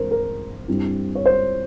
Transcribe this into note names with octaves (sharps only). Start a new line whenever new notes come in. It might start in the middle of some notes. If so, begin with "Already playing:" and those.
Already playing: G2 E3 G#3 C4 A#4 C5
A#4
G2 G3 C4 E4
C#5
C5